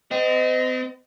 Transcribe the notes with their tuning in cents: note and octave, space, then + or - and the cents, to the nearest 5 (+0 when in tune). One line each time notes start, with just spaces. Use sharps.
C4 -40 D#5 +0